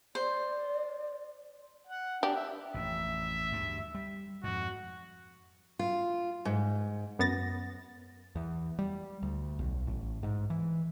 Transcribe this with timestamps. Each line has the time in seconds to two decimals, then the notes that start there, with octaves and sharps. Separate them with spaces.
0.15 C5 D5
1.87 F#5
2.23 D4 G4
2.35 E5
2.74 A1 F2 E5
3.51 D2 G2
3.95 G3
4.44 F2 G#2 F#4
5.79 F4
6.45 G#2
7.19 F#2 B3 A6 A#6
8.35 E2
8.79 G3
9.23 D2
9.59 B1
9.87 A1
10.23 G#2
10.50 E3